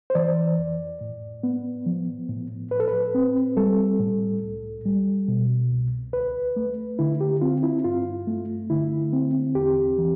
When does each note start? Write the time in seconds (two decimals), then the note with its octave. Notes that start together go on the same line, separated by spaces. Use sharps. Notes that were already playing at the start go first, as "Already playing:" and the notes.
0.10 C5
0.15 E3 D5
0.58 F2
1.01 A2
1.43 B3
1.86 F3
2.29 A2
2.71 A2 B4
2.80 A4
2.88 B4
3.15 C4
3.57 G3 A4
4.00 A2
4.43 C2
4.85 G3
5.28 B2
5.71 C2
6.13 D2 B4
6.56 A3
6.99 D3 E4
7.21 G4
7.41 C4 F4
7.63 E4
7.84 G2 F4
8.27 A3
8.70 D3 E4
9.13 C4
9.55 E2 G4
9.98 E3